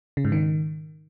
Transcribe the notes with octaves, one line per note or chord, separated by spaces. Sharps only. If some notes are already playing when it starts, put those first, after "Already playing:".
C#3
G#2
D#3